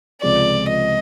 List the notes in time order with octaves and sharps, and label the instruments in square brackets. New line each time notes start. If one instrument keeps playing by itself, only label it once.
[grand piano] C#2 C3 F3 G#3 [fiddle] D5
[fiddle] D#5